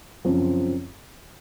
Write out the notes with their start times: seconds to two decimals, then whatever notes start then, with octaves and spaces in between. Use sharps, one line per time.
0.25 F#2 C#3 F3 C4